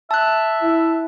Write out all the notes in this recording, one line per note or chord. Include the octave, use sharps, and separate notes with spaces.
E5 A5 F#6
E4